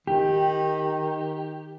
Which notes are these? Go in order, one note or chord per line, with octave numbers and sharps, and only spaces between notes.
D#3 G4